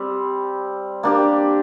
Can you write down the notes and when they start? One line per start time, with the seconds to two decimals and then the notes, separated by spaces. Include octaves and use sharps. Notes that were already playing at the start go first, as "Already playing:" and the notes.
Already playing: G3 C4
1.03 A#3 D4 G4